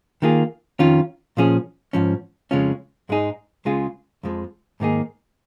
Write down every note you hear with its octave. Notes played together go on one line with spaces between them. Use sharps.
D#3 A#3 F4 G#4
F2 D#3 C#4 F4
A#2 F3 C#4 G#4
G#2 F3 C#4
F2 C#3 G#3 C#4 F4
G#2 G#3 D#4 G#4
C#2 C#3 G#3 F4 G#4
F2 F3 G#3
G#2 D#3 A#3 D#4 G#4